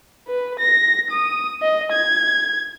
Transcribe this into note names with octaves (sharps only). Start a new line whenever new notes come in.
B4
A#6
D#6
D#5
G#6